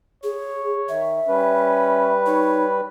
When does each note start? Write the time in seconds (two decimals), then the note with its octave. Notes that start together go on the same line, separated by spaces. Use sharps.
0.24 G#4 C#5
0.89 D#3 E5
1.28 G3 C#4 B4
2.26 D#4 C#5